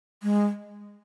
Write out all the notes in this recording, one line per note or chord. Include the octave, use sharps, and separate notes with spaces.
G#3